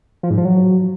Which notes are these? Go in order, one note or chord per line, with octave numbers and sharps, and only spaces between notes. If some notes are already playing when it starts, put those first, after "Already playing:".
F3
G#2
F3
F#3